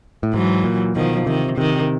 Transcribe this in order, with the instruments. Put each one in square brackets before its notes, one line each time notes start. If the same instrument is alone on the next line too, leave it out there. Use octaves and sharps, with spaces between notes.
[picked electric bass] A2
[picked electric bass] G#2 [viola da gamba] E3 F#3
[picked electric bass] A#2
[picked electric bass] B2 [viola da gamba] D#3 F3
[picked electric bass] C3 [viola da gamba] D#3
[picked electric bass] C3 [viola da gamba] D#3